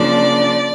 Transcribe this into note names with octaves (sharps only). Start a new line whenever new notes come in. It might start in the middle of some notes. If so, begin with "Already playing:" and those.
Already playing: C#3 F3 A#3 D4 D5